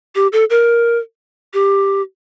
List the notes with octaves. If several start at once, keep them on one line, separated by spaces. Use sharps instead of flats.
G4
A4
A#4
G4